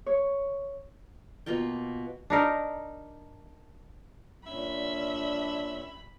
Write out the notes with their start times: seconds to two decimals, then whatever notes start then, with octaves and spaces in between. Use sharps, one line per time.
0.06 C#5
1.46 B2 A#3 F4 G5
2.30 D4 D#4 A#4
4.46 A#2 C#4 D4 E5 B5